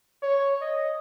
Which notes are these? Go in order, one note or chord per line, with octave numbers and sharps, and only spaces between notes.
C#5
D#5